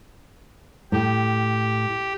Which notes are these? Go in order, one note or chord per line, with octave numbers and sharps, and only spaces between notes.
A2 G4